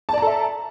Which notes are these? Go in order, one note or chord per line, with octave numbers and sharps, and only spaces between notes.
A4 D5 E5 A5 A#5